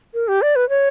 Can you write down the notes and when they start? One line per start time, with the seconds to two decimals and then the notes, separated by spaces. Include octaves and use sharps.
0.14 A#4
0.28 G4
0.42 D5
0.56 B4
0.69 C#5